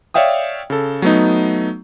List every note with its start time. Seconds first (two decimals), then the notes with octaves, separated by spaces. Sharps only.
0.14 C#5 D5 E5 F5 G5 D#6
0.70 C#3 A4
1.02 F#3 A3 B3 D#4